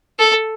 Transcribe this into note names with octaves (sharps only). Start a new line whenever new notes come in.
A4